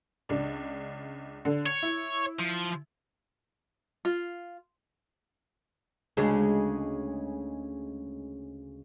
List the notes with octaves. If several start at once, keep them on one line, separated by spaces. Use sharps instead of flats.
C#2 D4
D3
C#5 C#7
E4
F3
F4
D2 C#3 G#3